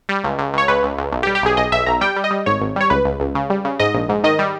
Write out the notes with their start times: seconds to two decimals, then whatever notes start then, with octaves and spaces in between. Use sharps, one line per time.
0.09 G3
0.24 C#2
0.39 C#2
0.53 C#2 C#5
0.68 C#2 B4
0.83 C#2
0.98 C#2
1.12 B1
1.23 G4
1.27 G3
1.35 G4
1.42 B1 G#4
1.57 B1 D#5
1.72 B1 E5
1.86 B1 A#5
2.01 G3 G5
2.16 G3
2.24 D#5
2.31 G3
2.46 G#1 C#5
2.61 G#1
2.76 G3 C#5
2.90 C#2 B4
3.05 C#2
3.20 C#2
3.35 C#3
3.50 G3
3.65 C#3
3.79 G#2 D#5
3.94 A#1
4.09 G#2
4.24 D#3 D#5
4.39 G3